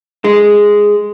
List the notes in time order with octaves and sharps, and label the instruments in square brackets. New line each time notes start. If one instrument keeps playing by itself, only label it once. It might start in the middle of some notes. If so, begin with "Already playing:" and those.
[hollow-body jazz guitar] G#3